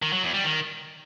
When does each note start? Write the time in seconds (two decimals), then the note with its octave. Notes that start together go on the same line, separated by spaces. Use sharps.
0.02 D#3
0.13 F#3
0.23 E2
0.34 G3
0.45 D#3